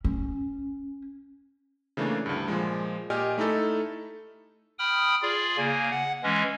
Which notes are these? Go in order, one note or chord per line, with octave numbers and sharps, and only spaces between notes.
C#4
C#3 E3 A3 A#3 D4
D2 G2
A#2 F3 G#3
A#2 G4 D5 D#5 G#5 F6
A3 D#4 E4 A4
G5 B5 D#6 F6
F4 G#4 D5
C#3 A#3 G#5
F#5
E3 G#3 C#4